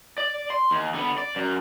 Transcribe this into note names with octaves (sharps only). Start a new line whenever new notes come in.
D5
C6
D#2
D3 B3
D5
F#2